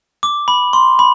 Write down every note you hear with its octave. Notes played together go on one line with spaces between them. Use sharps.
D6
B5
C6
B5